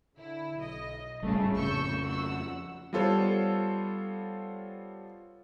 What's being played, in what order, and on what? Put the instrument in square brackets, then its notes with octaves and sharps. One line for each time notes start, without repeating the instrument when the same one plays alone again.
[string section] D3 E4
B1 D#5
[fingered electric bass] G#1 A2 G3 [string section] C#3 A3
[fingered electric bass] F2 C#3 [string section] C#6 E6 G6
[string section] F#5 E6
[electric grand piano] G3 B3 F4 A4 C5 C#5